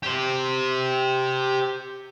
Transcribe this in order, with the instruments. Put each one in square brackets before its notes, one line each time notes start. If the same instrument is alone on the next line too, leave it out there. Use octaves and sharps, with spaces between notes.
[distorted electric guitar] G4 C5